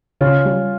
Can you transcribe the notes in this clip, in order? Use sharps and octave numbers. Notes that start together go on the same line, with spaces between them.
C#3 C#4 F4
G3